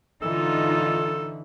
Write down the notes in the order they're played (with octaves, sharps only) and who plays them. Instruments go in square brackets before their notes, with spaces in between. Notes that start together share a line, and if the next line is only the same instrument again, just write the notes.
[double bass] D3 E3 [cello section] D#4 F4 [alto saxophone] A4